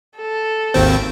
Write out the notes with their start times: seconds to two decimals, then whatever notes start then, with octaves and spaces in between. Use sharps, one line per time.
0.16 A4
0.74 G#1 D#2 C4